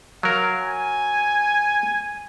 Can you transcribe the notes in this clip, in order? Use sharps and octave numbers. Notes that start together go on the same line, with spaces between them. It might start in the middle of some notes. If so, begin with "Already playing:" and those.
F#3 A#4 F5
G#5